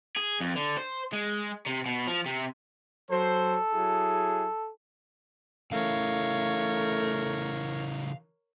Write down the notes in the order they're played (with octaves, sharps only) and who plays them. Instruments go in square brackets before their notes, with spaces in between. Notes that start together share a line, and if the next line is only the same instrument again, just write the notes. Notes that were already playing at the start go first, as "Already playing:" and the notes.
[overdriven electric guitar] G#4
F2
D3
C5
G#3
C3
B2
F3
C3
[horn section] F#3 C5 [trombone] A4
[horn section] F#3 E4 G#4
[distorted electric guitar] C#3 E3 [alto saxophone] A3 [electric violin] A#4 C#5 [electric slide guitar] F5